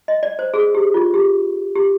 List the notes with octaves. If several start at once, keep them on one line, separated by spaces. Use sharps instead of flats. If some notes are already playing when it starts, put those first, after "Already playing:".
D#5
D5
C5
G#4
G4
F4
G4
G4